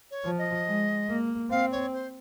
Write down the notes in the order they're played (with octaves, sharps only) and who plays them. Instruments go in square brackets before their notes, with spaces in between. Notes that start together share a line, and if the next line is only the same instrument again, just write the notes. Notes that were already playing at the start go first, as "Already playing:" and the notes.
[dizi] C#5
[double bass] F3
[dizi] D#5
[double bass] G#3
A#3
[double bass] C4 [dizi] F5
[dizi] C#5
C5